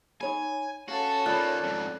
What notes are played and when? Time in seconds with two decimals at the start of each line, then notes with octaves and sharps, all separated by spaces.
0.21 D#4 C#5 G#5 B5
0.88 C#4 F#4 A4 F5
1.26 D#3 A#3 F4 D5 B5 F#6
1.63 F2 G#2